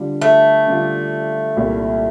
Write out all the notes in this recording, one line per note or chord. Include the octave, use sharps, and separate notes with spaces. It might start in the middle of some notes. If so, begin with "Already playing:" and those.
Already playing: D3 G3 D4 F4
A3
D3 G3 D4 F4
C2 A#2 G3 A#3 E4